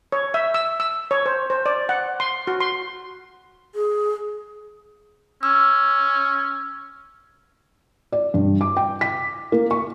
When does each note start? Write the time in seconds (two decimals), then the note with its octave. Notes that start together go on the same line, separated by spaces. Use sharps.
0.12 C#5
0.34 E5
0.54 E6
0.80 E6
1.11 C#5
1.26 C5
1.50 C5
1.66 D5
1.89 F#5
2.20 C6
2.47 F#4
2.60 C6
3.74 G#4
5.43 C#4 E6
8.12 D5
8.34 G2
8.61 D6
8.77 G5
9.01 B6
9.52 A#3
9.71 C#6